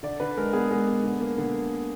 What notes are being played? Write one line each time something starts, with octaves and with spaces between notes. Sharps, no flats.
D3 D5
D3 B4
G#3 A#4
B3 G#4
G#3
B3
D3
A#3
D3